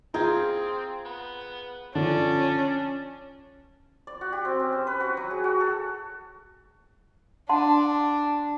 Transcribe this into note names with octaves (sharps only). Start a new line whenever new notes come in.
C4 F4 G#4 A#5 G6 G#6
B3
D3 F3 C#4 D4
D5
F#4
G4
C4
C#4
C5
B4
F#4
F#3
G#4
F#4
A4
D4 F#5 A5 C6